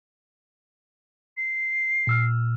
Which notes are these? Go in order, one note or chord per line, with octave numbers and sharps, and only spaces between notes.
C7
A#2 E6 F6